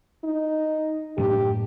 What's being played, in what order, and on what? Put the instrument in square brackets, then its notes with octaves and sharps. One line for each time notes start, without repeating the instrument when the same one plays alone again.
[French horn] D#4
[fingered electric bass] F#2 A2 D4 [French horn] G4